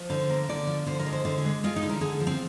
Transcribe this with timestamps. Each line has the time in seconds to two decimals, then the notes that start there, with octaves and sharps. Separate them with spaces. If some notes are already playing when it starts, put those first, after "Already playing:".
Already playing: F3
0.10 D3 C5
0.30 A#3
0.49 D3 D5
0.67 F3
0.86 D3 C5
0.99 A#4
1.06 G#3
1.13 C5
1.25 D3 C5
1.38 G#4
1.45 G#3
1.64 G#3 F4
1.76 D#4
1.83 D3
1.89 A#4
2.01 D3 G#4
2.20 F3
2.27 C4